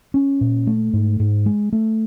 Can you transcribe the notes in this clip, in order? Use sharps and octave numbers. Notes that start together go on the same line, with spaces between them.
C#4
A#2
A3
G#2
G#2
G#3
A3